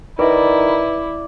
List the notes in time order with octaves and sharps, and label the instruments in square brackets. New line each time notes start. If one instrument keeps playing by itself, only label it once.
[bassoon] D#3 [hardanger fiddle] E4 [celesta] B4 E5 [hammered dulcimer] D5